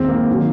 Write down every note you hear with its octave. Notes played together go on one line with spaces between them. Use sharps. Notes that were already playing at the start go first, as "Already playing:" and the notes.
Already playing: D#2 D#3 G#3 C4
A#3
D#3 F#3